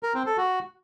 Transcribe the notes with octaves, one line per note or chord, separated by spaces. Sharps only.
A#4
C4
A4
F#4